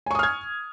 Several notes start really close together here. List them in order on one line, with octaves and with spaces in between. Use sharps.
G#5 C#6 D#6 F6 G#6